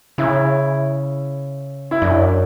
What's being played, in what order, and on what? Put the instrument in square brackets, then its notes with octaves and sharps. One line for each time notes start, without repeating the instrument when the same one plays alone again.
[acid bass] C#3 [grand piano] E4
[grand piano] E4
[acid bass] F#2 [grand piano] D4